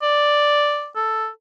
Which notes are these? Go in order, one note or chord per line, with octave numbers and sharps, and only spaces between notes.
D5
A4